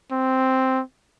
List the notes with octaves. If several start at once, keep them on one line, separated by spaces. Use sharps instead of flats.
C4